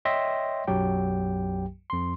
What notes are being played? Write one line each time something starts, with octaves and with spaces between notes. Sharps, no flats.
C#5 D#5 E5 G5 C6 A#6
B1 F#2 F#3 G4 G5
F2 C6